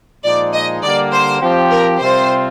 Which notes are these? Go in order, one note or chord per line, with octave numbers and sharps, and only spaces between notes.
A#2 F3 G#3 D#4 D5
D#5
D3 G3 A#3 D5
C5
F3 C4 G4
A#4
C3 G3 C4 F4 C5